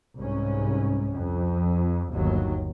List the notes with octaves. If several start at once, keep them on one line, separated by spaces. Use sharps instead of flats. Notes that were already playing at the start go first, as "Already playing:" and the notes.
C2 G#2 C#4
F2
G1 D#2 F#3